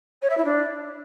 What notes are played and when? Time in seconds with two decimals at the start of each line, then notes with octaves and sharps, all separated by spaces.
0.22 C#5
0.29 E5
0.37 E4
0.44 D4